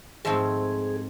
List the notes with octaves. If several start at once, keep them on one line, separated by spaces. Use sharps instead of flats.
G#2 F3 A3 C4 G#4